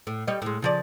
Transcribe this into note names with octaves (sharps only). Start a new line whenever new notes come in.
A2
G3 C#5 D#5
A2 G#3
C#3 F3 D5